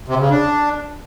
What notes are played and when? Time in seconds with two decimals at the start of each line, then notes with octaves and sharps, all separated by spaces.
0.08 C3
0.19 C#3
0.30 D4